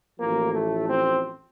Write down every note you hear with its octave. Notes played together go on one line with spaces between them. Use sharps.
A1 A2 F3 A#3
A3
C4